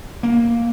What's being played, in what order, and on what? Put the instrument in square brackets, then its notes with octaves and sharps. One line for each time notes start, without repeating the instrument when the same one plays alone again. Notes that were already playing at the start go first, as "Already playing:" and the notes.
[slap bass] A#3